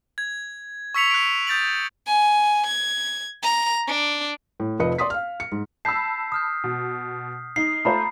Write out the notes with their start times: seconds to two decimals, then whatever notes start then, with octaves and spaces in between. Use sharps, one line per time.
0.18 G#6
0.95 C#6 E6 B6 C#7 F7
1.11 F#6 D7
1.47 D#6 G6 A6 D7 F#7
2.07 G#5
2.67 G#6
3.43 A#5
3.87 D4
4.60 A2
4.79 F1 F3 B4 D#5 C#7
4.98 D5 C6 D#6 B6
5.10 F5 F6
5.40 C#7
5.52 G#2
5.85 A5 B5 E6 G6 B6 C7
6.32 D#6 F6 G6
6.64 B2
7.56 D#4 C7
7.85 A3 F4 C5 A#5 B5